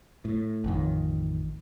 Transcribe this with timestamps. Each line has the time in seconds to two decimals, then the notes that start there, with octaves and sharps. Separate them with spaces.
0.25 A2
0.64 A1 F2 D#3